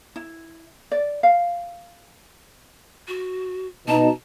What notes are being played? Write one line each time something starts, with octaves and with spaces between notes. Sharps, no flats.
E4
D5
F5
F#4
B2 D#4 A5